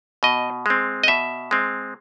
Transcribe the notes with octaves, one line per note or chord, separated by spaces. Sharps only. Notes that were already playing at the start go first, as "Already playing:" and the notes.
B2 D#5
G#3 C4
D#5
B2 E5
G#3 C4